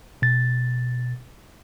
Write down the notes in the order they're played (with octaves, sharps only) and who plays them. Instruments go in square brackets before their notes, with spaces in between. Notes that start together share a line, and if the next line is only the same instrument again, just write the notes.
[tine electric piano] B2 A6